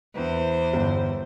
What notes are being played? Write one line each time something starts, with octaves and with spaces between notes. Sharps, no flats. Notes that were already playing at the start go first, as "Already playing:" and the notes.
E2 C5
G1